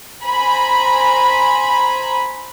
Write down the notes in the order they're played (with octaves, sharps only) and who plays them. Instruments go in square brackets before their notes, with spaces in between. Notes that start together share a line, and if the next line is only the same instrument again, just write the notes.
[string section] C5 G#5 A#5 B5